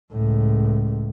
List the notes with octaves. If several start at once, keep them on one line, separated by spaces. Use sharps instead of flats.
C#2 A2